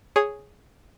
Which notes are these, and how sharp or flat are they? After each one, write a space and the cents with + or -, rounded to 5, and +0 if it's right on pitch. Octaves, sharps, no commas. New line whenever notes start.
G#4 +0 C#5 +0 D#6 +0